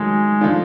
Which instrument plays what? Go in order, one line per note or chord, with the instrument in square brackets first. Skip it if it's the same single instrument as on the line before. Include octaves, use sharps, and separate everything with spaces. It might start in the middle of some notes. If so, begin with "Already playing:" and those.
Already playing: [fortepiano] D#3 F#3 A3 [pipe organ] G#3
[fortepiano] F3 A3 D4 F4